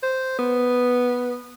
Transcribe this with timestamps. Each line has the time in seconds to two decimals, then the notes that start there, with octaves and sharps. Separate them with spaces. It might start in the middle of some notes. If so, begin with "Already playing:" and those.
0.03 C5
0.38 B3